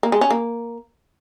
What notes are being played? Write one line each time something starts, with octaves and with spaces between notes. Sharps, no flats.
A#3
G#3
C#4
A#3